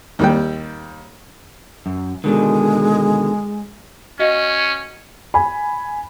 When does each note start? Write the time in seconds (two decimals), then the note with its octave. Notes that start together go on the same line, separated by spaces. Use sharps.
0.19 D#2 G3 G5
1.86 F#2
2.24 B2 D3 D#3 G#3
4.19 C#4 F#4 D#5 F5
5.34 G#5 B5